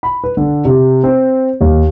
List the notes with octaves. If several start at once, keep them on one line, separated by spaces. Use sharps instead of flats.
B5
B4
D3
C3
C4
D#2